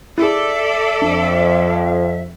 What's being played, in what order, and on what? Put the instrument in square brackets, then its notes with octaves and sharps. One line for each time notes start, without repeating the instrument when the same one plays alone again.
[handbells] E4 G#4 [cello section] A4 D5 [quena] E5
[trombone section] F2 [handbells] D4